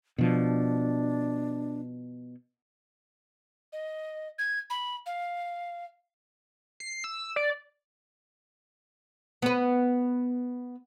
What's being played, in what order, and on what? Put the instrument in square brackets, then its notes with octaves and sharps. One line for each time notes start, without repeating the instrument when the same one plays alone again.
[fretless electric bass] B2 F3 [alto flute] D4
[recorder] D#5
G#6
B5
F5
[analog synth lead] C7
E6
D5
[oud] B3 B4